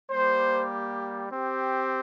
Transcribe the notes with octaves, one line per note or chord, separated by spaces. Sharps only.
G3 A#3 G4 C5
C4 G4